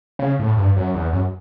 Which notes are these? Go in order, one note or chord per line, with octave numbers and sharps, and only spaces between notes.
C#3
A2
G2
F#2
E2
F#2